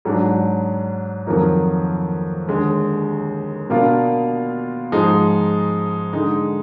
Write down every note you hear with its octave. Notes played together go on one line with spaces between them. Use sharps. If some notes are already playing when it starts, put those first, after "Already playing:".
G#2 F#3 D4
F2 D#3 F#3 A#3
D#2 D3 G#3
B2 A#3 D4 F4
G#2 F3 G#3 D#4
D3 G#3 D#4